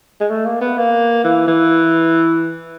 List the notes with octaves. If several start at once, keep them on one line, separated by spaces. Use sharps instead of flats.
G#3
A3
A#3
B3
A#3
E3
E3